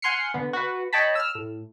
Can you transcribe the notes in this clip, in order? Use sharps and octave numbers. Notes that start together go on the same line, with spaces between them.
F#5 G#5 C6 F6 C7 C#7
D3 B3
F#4 B4
C#5 D#5 G5 A5 B5
E6 F6
A2